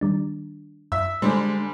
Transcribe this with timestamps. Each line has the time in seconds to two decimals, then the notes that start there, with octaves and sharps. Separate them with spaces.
0.01 D#3 G3 D4
0.92 F#2 E5 E6
1.22 D3 G3 G#3 D4 C5